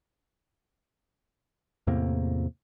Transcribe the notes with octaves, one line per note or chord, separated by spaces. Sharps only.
E2 A2 C3 A#3